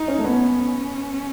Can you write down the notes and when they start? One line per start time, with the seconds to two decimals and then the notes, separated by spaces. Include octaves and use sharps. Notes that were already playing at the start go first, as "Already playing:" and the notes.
Already playing: D#4
0.08 C#4
0.19 A3
0.24 B3 C#4